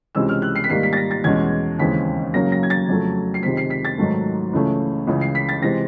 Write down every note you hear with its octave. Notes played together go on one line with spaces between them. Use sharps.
C#2 C3 E3 G#3 C#4 E6
F6
F#6
C7
B6
G#2 D#3 G3 A#3 C7
B6
A6
A#6
A6
E2 B2 G#3 C#4 G#6
D#2 C#3 E3 G#3 C4 B6
F#2 C#3 F#3 A#3 C#4 A#6
A#6
G#6
A6
F2 C#3 F#3 A3
C7
C#2 C3 D#3 G#3 C4 B6
C7
B6
A6
G#2 D#3 F#3 A3
C#2 C#3 E3 A3 C#4
C#2 C#3 E3
C7
B6
A6
C3 E3 G#3 C4 A#6